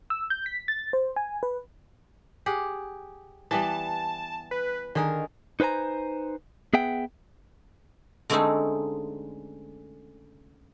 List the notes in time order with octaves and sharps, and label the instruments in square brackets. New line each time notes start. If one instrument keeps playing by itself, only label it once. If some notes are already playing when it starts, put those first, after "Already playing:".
[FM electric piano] E6
G6
B6
A6
C5
G#5
B4
[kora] G4 G#4 F#5
[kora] E3 G3 B3 [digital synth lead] A5
[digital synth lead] B4
[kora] D3 G#4 A#4 [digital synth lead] D#3
[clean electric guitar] D#4 B4 C5 G#5 A#5
B3 G#4 E5 F#5 G5
[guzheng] D3 G#3 A3 C4 C#4 D#4